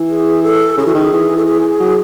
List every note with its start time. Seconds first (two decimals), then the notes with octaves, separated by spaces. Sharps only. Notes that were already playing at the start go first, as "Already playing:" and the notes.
Already playing: E3
0.09 G#4
0.44 A4
0.77 C#3 G#4
0.86 E3 F#4
0.94 D#3 G#4
1.12 E3
1.37 A4
1.46 G#4
1.80 F#3